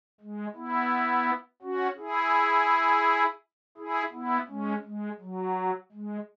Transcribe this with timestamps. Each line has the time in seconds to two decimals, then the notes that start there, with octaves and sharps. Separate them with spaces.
0.20 G#3
0.55 B3 E4
1.62 C#4 F#4
1.98 E4 G#4
3.78 E4 G#4
4.12 B3 E4
4.48 G#3 C#4
4.84 G#3
5.20 F#3
5.92 G#3